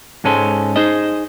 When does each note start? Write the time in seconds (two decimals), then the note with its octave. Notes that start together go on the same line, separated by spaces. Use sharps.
0.24 G#2 G#3 C#4 A4 C5
0.76 D#4 G#4 C5 D#5